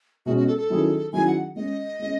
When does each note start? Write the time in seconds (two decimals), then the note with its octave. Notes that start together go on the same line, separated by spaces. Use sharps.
0.26 B2 G#3 C#4 F#4
0.37 F#4
0.47 A4
0.58 A4
0.70 D#3 F#3 C#4 E4 G#4
1.12 D#3 F#3 C#4 E4 G#4 G#5
1.27 F#5
1.56 G#3 C#4 G#4 D#5
1.99 G#3 C#4 G#4